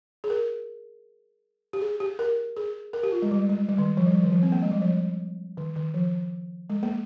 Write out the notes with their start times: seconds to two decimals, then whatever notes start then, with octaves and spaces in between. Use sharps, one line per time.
0.24 G#4
0.30 A#4
1.73 G4
1.81 G#4
2.00 G4
2.19 A#4
2.57 G#4
2.93 A#4
3.03 G4
3.12 F4
3.22 G#3
3.31 G3
3.49 G#3
3.69 G3
3.79 D#3
3.97 F3
4.06 G3
4.15 F3
4.23 D#3
4.32 F3
4.43 C4
4.52 A#3
4.63 G#3
4.71 G3
4.81 F3
5.57 D#3
5.76 D#3
5.94 F3
6.70 G#3
6.83 A#3